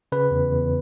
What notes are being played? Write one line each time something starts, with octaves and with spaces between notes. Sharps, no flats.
C#3 B4
E2
E2